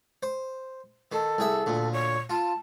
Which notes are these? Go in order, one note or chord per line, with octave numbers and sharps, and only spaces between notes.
C5
D#3 A4
C2 G#4 E5
D2 A#2
C#5
F4 A5